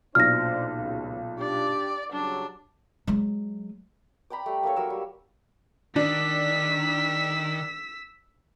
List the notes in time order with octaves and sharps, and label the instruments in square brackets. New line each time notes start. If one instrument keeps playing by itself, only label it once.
[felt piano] B1 A#2 [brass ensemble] D4 C5 D5 [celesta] F6 A#6
[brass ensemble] C#2
[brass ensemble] D4 G4 [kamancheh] D5
[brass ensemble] C#3 F#3 G3 [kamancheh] D4
[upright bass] F#3 G#3
[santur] D5 G5 A#5 B5
G3 A3
A#3 D#4 A4 C#5
F#3 A#4 E6
G3
[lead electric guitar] D#3 [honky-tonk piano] D4 [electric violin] E6 B6